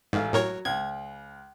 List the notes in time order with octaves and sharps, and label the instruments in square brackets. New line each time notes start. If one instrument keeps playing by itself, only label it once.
[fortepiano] A1 A3 F5 [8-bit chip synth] G#2
[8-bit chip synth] A2 A#4 C#5 [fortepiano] F#3
[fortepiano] C#2 [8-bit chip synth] G#6